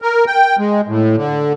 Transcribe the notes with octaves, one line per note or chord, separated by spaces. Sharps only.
A#4
G5
G#3
A2
D3